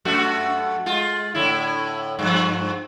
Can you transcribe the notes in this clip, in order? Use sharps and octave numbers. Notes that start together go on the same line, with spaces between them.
F#2 A3 F#4
G#3 F4
A2 D3 E4
G2 F3